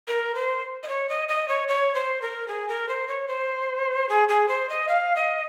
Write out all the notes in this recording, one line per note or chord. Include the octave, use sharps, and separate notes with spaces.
A#4
C5
D#5
C#5
D#5
D#5
C#5
C#5
C5
A#4
G#4
A#4
C5
C#5
C5
G#4
G#4
C5
D#5
F5
D#5